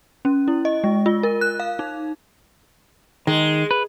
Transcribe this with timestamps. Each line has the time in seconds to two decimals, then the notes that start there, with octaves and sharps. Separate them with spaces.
0.25 C#4
0.48 E4
0.65 D#5
0.84 G#3
1.06 F4
1.23 A#4
1.41 F#6
1.60 F5
1.79 D#4
3.27 D#3 G#3
3.71 B4